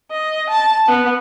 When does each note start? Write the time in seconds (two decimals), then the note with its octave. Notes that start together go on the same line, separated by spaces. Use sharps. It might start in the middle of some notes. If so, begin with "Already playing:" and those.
0.12 D#5
0.50 A5
0.89 B3